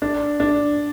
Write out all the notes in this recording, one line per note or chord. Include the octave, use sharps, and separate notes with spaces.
D4
D4